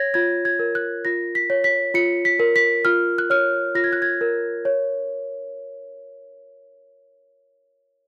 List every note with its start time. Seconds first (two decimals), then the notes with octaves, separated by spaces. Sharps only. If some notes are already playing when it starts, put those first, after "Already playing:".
Already playing: C#5 G#6 A#6
0.14 F4 G#6
0.45 G#6
0.59 A#4
0.75 F#6
1.05 F4 A#6
1.35 B6
1.50 C#5
1.64 B6
1.94 F4 C#7
2.25 B6
2.39 A#4
2.56 B6
2.85 F4 F6
3.18 F#6
3.30 C#5 F6
3.75 F4 A#6
3.84 G#6
3.93 F#6
4.02 G#6
4.21 A#4
4.65 C#5